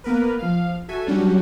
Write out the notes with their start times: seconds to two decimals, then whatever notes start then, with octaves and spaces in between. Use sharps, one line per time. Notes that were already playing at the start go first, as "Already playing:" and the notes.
0.04 A#3 B3 A#4 B4
0.39 F3 F5
0.88 F#4 A4 E5 G#5
1.06 F#3 G3 C#4 D4 F#4 G4